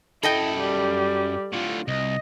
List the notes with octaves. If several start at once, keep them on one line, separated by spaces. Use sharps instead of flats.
F#2 E4 A4 D#5 G5 B5
G3
A2 D3 F4
C2 D#5